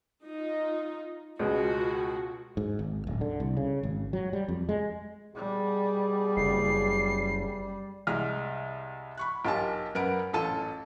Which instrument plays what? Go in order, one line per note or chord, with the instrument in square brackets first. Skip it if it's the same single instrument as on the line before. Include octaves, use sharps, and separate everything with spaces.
[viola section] D#4 F4
[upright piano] C#2 B2 G#3 [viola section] F4 F#4
[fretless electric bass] G#2
G#1
D1
D3
C2
C#3
G#1
F#3
G3
F2
G#3
[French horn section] B2 G#4 [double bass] G3
[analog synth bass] F#1 [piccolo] C7
[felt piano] C2 G#3 F6
B5 C#6 F#6
B1 F4 G4 A#4 G#5 A5
F#2 A#4 B4 F#5 D7
A1 F4 A4 A5 D#7